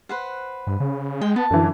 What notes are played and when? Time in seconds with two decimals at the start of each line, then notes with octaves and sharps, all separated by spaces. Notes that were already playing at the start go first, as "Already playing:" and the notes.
0.09 B4 C5 F#5
0.67 G2
0.80 C#3
1.21 G#3 G5
1.36 B3 A5
1.51 F#2 D3 E3